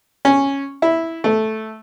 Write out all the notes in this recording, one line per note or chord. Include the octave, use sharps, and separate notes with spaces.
C#4
E4
A3